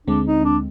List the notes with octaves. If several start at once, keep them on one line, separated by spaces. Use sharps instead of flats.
D2 D3 G#3 C4 D4
D#4
D4